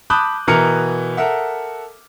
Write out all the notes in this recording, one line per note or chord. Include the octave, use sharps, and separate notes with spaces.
A5 B5 D6 D#6 F#6 G6
B2 E3 A#4 A#5 F6 C#7
A4 A#4 E5 F#5